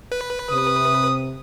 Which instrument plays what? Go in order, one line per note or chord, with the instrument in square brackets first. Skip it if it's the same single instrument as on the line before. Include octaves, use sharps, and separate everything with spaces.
[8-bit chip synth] B4
[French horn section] C3 [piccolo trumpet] D#6